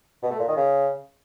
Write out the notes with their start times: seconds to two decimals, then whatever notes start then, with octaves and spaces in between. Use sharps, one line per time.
0.22 B2
0.31 A3
0.39 A#2
0.48 D#3
0.56 C#3